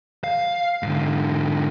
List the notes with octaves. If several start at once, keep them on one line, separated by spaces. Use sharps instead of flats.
F5
G#2 D3